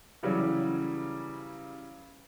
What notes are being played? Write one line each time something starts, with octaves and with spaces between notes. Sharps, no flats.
C#3 E3 F#3 G3